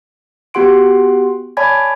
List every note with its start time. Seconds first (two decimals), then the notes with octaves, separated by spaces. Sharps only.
0.54 B3 F#4 G4 F#5 C6 D7
1.57 C#5 D5 G#5 A5 B5 G#6